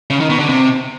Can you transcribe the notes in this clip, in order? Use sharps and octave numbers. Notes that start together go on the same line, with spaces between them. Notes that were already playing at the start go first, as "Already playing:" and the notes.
C#3
D#3
B2
D3
C3